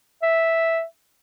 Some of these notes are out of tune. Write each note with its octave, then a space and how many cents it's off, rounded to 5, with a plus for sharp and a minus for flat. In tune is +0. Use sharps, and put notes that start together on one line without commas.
E5 -5